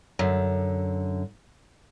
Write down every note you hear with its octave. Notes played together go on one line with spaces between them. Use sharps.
F#2 D3